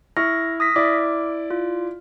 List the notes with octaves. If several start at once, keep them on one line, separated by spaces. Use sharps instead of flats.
E4 C#6 F6 A#6
D#6 A#6 B6
E4 D5 D6
F4